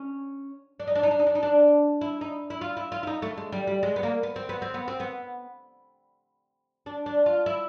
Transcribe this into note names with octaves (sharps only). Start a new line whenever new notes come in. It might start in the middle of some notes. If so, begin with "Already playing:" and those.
Already playing: C#4
D4
D#4
D4
D#4
D4
D#4
D4
D#4
D4
E4
D#4
E4
F4
E4
F4
E4
D#4
A3
G#3
G3
G3
G#3
B3
A#3
B3
C4
B3
C4
B3
C4
B3
D4
D4
F4
E4